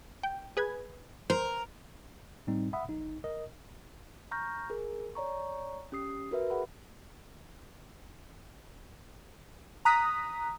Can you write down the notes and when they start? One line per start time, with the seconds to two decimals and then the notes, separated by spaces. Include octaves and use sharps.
0.23 G5
0.57 G#4 B4 G#6
1.30 A#4 C5
2.47 A2 G3 C4 D#4
2.73 E5 F#5 B5 D#6
2.89 A#1 D#4
3.24 A#4 D#5
4.31 A#5 C#6 F6 G6 A#6
4.70 G#4 A#4
5.15 C#5 D5 A#5 C#6
5.92 C#4 G4 D#6 C7
6.31 F#4 A#4 B4 E5
6.50 G#4 F#5 B5
9.85 A#5 D#6 F#6 B6